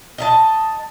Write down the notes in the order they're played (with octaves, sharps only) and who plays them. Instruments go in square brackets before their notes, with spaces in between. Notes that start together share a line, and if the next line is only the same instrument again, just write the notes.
[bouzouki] D#5 E5 A5